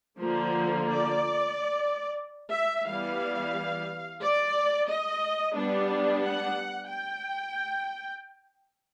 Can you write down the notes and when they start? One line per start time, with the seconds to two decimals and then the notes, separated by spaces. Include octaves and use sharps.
0.19 D3 F3 A#3 C5
0.87 D5
2.53 E5
2.86 E3 G3 B3 F5
4.21 D5
4.87 D#5
5.54 G3 B3 D4
6.21 F#5
6.88 G5